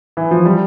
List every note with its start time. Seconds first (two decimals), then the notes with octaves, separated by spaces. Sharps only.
0.17 E3
0.31 F3
0.45 G3